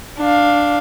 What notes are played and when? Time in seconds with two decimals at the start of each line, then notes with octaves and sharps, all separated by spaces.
0.18 D4 F5